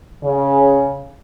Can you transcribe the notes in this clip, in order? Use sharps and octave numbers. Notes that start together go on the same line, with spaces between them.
C#3